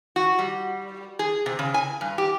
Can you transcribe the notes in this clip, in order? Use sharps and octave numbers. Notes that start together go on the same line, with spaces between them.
F#4
G3
G#4
C3
C#3
G#5
G2
G4